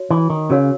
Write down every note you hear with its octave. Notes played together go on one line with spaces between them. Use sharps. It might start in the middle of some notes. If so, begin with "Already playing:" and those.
Already playing: F#4 C#5
E3
D#3
C#3 F#4 A#4 C#5 F5